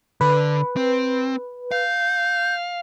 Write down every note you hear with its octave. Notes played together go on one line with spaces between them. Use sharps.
D3 B4
C4
F5 G6